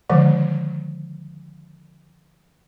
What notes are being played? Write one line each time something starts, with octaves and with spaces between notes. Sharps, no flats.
D3 D#3 F3 G#3